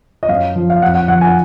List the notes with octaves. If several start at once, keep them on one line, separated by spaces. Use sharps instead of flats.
D#5
F#2 F5
F3
F5
F2 F#5
F#5
F3 F#5
G#5